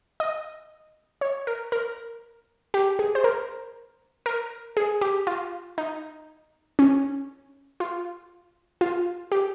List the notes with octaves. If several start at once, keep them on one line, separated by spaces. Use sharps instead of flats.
D#5
C#5
A#4
A#4
G4
G#4
C5
A#4
A#4
G#4
G4
F4
D#4
C#4
F4
F4
G4